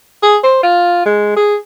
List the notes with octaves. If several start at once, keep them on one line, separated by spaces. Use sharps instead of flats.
G#4
C5
F4
G#3
G#4